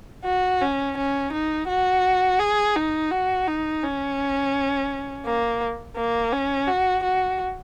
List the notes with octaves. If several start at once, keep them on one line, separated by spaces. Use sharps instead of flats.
F#4
C#4
C#4
D#4
F#4
G#4
D#4
F#4
D#4
C#4
A#3
A#3
C#4
F#4
F#4